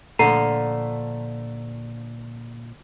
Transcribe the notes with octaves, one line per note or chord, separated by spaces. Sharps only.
A#2 D3 F3 A3 A#5 C7 D#7